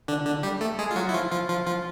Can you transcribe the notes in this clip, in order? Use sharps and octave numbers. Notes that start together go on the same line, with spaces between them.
D3 D4
D3 D4
G3 G4
A3 A4
G#3 G#4
F4
F#3 F#4
E4
F3 F4
F3 F4
F3 F4
F3 F4